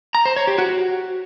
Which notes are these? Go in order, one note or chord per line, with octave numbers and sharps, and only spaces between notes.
A#5
C5
C#5
G4
F#4